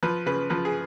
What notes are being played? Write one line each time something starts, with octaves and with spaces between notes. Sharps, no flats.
F3 B4
C#3 B4
F3 B4
G#4